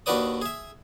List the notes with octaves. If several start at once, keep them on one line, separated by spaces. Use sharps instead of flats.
D#2 D4 F#4 B4 D5 D#6
G#4 E5